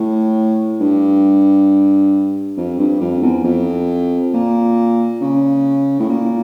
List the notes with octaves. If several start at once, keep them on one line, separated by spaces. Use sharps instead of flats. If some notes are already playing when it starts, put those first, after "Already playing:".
Already playing: A2
G2
F2
G2
F2
E2
F2
A#2
C#3
A2
A#2